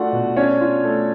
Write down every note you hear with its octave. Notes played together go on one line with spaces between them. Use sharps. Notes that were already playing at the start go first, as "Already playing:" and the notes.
Already playing: A3 D4 F4 F#4 F#5
B2
C#4 D4 C#5
F4
A3